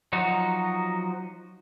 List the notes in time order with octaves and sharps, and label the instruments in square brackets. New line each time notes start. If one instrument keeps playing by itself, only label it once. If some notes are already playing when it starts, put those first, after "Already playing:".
[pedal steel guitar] F3 F#3 D#4 F#4